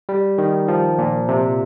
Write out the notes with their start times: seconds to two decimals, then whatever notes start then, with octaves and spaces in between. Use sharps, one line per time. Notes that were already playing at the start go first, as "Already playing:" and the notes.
0.09 G3
0.38 D#3
0.68 F3
0.99 A#2
1.28 C3